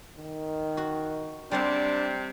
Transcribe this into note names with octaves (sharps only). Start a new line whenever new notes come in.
D#3
F#4
C3 G3 C4 D4 F#5